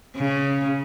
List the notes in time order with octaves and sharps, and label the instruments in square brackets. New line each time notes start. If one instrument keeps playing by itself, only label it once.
[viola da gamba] C#3